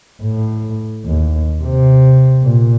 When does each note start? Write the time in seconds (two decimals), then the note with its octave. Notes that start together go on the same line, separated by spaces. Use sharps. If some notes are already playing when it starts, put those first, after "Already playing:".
0.23 A2
1.05 D#2
1.63 C3
2.43 A#2